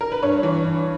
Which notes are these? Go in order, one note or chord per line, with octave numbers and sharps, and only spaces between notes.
A#4
B4
G2 C#5
E3
G2